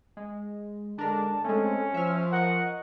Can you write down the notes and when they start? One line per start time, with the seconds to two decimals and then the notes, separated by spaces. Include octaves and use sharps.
0.17 G#3
0.98 D3 G#3 D4 A#4 D5 A5
1.44 G#3 A3 C4 C#4 A4
1.94 F3 E5 F6
2.32 A#4 D#5 F#5 C#6